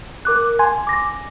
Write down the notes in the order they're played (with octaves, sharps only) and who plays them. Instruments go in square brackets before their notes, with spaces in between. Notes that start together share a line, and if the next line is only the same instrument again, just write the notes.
[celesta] A#4 D6 F#6
[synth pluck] G#5 [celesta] C6
[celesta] D6 A#6